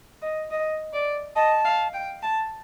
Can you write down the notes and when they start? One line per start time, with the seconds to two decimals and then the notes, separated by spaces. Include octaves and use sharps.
0.22 D#5
0.51 D#5
0.93 D5
1.36 D#5 A5
1.65 F5
1.93 G5
2.22 A5